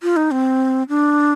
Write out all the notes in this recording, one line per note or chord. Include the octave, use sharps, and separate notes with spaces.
F4
D#4
C4
D4